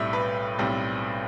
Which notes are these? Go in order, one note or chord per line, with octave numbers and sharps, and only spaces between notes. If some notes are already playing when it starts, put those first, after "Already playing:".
Already playing: B1 A2 G3 C4 E5
B4
B1 A2 G3 C4